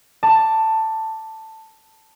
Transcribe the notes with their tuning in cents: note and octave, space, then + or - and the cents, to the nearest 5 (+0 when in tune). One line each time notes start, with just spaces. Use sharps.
A5 +10 D6 +0